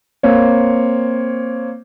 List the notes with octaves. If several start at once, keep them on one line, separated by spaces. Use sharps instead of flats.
A#3 C4 C#5